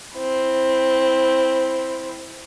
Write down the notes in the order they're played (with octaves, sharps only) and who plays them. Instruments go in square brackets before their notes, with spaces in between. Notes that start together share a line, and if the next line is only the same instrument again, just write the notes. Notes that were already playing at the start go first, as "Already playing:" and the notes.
[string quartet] C4 E4